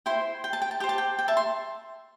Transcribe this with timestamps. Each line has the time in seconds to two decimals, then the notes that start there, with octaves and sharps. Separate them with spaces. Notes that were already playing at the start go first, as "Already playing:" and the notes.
0.06 E4 C5 G5 C6
0.44 G5
0.53 A5
0.62 G5
0.71 A5
0.80 G4 C5 G5
0.89 A5
0.98 G5
1.19 G5
1.28 E5 A5
1.37 C6